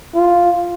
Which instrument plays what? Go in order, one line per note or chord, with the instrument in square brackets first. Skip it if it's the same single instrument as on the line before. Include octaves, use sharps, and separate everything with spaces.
[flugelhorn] F4